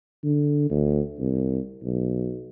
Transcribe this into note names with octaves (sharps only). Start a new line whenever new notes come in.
D3
D2
C2
B1